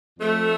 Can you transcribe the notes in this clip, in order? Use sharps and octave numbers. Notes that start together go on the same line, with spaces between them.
F2 A3